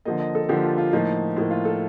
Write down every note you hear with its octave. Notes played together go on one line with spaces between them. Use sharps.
D3 F3 A#3 D#5
D#5
A4
D3 F3 A#3 G4
F4
F4
A2 F3 A#3 D#4
A2 F3 A#3
F4
A4